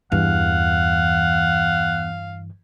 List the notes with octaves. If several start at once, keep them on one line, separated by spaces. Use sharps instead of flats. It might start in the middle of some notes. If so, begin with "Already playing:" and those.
E2 G2 E3 F5 F#5